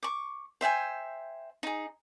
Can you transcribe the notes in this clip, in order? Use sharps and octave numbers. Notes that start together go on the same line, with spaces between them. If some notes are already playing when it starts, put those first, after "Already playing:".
C#6 D6
C5 E5 G5 G#5
D#4 G#4